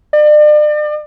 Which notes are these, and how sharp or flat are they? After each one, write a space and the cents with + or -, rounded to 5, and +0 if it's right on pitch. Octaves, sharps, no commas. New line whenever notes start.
D5 +40